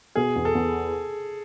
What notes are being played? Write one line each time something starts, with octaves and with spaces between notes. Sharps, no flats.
B2 G#4
E2
A4
E2